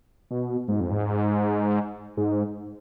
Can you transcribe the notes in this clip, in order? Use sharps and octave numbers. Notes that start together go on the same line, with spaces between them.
B2
G#2
F2
G#2
G#2